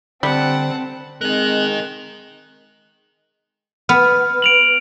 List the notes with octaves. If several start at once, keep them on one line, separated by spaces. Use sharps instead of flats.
D3 G3 C4 F#5 A5
G#3 C4 A#4 D#5 F#6
B3 F6
D7 F7 F#7